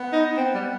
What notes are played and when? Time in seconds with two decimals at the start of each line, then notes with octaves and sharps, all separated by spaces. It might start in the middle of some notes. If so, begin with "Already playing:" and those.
Already playing: B3
0.13 D#4
0.37 C4
0.54 G3